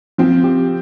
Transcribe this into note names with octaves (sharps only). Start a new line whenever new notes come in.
F3 C4
G4